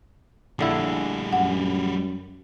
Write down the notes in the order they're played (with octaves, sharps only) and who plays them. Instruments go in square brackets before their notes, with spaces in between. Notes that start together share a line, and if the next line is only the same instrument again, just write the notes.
[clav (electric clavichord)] A#1 D3 E4 [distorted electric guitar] G3 G#4
[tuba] F#2 [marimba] F#5